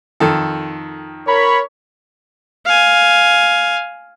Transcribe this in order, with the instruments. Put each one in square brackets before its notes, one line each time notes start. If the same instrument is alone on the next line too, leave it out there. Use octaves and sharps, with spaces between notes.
[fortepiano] F2 D#3 A4
[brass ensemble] A#4 C#5 [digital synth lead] B5
[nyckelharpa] F5 G#5